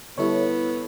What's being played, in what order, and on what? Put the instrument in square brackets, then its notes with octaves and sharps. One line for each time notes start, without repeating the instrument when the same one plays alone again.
[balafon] D3 G3 G4 [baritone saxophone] B3 [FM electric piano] E4 A4 C#5